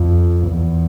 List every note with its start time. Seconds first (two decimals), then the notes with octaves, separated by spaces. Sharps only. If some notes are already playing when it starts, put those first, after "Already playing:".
Already playing: F2
0.47 E2